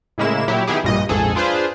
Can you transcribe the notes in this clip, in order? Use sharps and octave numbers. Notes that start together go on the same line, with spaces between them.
A2 C#3 G#3 A#3 E4 E7
A#2 F#3 E4 G4
D#3 B3 E4 G4 G#4
A#1 G2 A#2 D#5
A#1 F2 G#2 G#4 A4
D4 F4 G#4 B4 C5